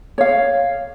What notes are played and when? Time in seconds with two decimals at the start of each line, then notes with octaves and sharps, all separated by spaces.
0.18 C#5 F5